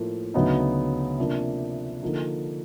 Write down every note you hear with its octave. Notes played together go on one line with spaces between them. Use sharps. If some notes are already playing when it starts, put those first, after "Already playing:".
Already playing: A2 F3 A#3
D2 C#3 F#3 B3 D#4
C3 F3 A#3 D4
D3 F3 A#3 D#4